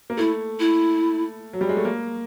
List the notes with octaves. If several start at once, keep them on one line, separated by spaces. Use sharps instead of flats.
A#3
A3 E4
E4
F#3
G3
G#3
A3
A#3